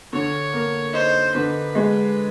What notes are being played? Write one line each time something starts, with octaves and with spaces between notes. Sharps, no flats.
D3 C#5
A#3
D#4 C5
D3 B4
G#3